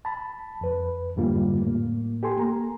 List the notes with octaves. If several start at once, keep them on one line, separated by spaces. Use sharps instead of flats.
A5 B5
F2 B4
F2 G#2 D3 G3 A#3 F4
A2 A#3
G4 A4 G#5 C6
A#3 A#5